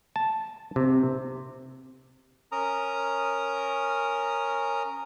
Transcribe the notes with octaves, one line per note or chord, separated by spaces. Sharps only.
A5
C3
C#4 A#4 A#5 D#6